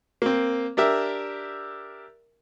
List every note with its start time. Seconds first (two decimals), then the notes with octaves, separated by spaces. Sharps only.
0.22 A#3 C4
0.77 D4 G4 A#4 E5